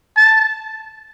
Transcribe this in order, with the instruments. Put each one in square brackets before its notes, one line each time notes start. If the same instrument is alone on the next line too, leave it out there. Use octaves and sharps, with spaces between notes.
[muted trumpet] A5